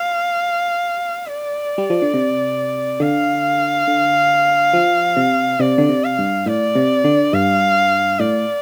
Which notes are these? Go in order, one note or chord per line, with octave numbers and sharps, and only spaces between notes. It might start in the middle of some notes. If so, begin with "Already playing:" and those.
Already playing: F5
D5
G3
F3
D3
C3
D3 F5
D3
F3
C3
C3 D5
D3
C3
F5
G2
A2 D5
C3
D3
G2 F5
A2 D5